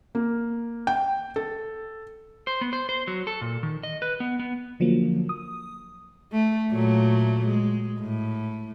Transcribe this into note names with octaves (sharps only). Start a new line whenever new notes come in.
A#3
G5
A4
C5
B3
C5
C5
F#3
A4
A#2
D#3
D#5
B4
B3
B3
D3 F3 F#3 A#3
D#6
A3
A#2 F#3 A3
G#3
A2